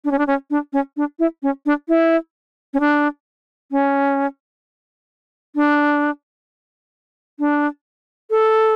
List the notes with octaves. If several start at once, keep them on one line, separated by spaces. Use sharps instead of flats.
D4
C#4
D4
C#4
D4
C#4
D4
E4
C#4
D4
E4
C#4
D4
C#4
D4
D4
A4